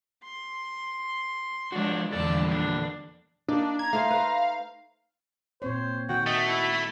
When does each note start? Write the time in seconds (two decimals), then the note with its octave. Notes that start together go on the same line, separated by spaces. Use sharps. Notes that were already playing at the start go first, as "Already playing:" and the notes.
0.23 C6
1.72 F3 G#3 D4 F#4
2.13 E2 A#2 D3 F3 G3 A4 D5 A5
2.48 D4
3.48 A#3 D4 D#4 D5
3.79 A#5 G#6
3.93 A3 D#4 C5 F5
4.11 B4 C5
5.62 A#2 C4 C5 C#5
6.09 D#3 F#4 G5
6.26 A3 D#5
6.48 E4